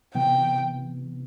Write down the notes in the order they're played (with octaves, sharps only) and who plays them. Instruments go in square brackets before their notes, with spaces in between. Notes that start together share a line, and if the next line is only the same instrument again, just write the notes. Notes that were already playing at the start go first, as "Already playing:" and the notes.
[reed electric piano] C3 E3 B3 [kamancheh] G5